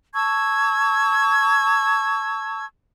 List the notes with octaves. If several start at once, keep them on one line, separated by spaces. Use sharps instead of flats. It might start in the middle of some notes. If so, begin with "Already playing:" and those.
A5 C#6 E6 G#6